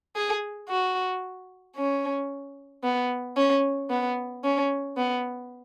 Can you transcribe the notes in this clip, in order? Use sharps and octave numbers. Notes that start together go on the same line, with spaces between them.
G#4
F#4
C#4
B3
C#4
B3
C#4
B3